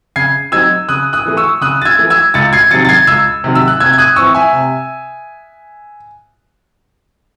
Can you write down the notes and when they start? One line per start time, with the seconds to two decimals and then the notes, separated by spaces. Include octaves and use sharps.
0.16 C#3 G#6 C7
0.52 F#3 C4 D#4 E6 G#6
0.89 C#3 D#6 F#6
1.13 D#6 F#6
1.26 E3 A3
1.37 C#6 E6
1.61 C#3 D#6 F#6
1.82 A6
1.85 E6 G#6
1.99 E3 A3
2.10 E6 G#6
2.34 C#2 A6 C#7
2.53 G#6 C7
2.71 C3 D#3 F#3 A6 C#7
2.85 A6
2.89 G#6 C7
3.07 C#2 E6 G#6
3.44 C3 D#3 F#3
3.55 E6
3.68 F#6
3.80 C3 E6 G#6
3.93 G#6
3.98 D#6 F#6
4.16 E3 C4 E4 C#6 E6
4.35 E5 G#5
4.53 C3